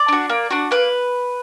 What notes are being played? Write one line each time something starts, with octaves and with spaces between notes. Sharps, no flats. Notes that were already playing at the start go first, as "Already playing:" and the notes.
Already playing: D5
D4 F#4
A#3
D4 F#4
A#3 B4